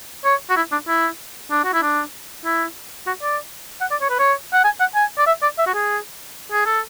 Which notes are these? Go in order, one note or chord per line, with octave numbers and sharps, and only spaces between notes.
C#5
F#4
E4
D4
E4
D4
F#4
E4
D4
E4
F#4
D5
F#5
D5
C#5
B4
C#5
F#5
G#5
F#5
G#5
D5
E5
D5
E5
F#4
G#4
G#4
A4